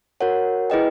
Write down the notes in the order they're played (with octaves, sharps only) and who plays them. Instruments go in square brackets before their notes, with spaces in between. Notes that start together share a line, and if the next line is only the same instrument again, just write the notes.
[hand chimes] F#4 A#4 C#5 F#5
E4 G#4 B4 D#5 G5